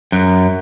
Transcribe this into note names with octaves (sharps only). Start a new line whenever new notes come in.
F#2